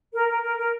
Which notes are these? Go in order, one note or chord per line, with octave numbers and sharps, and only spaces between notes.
A#4
A#4
A#4
A#4